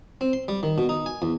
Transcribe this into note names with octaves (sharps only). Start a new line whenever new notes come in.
C4
C6
G3
D#3
B2
D#4
G#5
E2